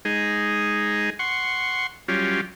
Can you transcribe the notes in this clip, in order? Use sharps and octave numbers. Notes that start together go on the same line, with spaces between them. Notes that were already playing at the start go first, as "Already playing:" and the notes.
G#3 D#4 G#4
F#5 C6 C#6
F#3 G3 C#4 F4 G4